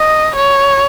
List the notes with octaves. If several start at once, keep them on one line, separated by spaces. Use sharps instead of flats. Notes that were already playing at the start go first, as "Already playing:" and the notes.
Already playing: D#5
C#5